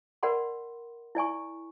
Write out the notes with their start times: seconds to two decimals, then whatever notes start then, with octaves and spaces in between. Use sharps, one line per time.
0.23 A#4 D5 F#5 B5 C6
1.15 E4 D5 G#5 C#6